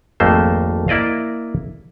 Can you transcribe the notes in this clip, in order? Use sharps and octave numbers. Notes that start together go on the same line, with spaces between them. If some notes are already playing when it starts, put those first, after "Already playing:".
G#1 F2 A3 A#3 C5
A#3 E4 D5 D#5 F5